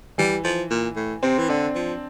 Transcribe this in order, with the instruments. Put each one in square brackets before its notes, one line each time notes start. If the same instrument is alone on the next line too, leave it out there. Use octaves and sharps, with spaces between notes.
[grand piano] E3 [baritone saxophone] G3
[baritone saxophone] F3
A#2
A2
[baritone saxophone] C3 [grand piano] C4
[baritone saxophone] E3
[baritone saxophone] D3 [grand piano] D4
[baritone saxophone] F3